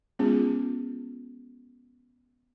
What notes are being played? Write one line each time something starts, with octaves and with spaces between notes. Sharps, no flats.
G#3 B3 C#4 F4 G#4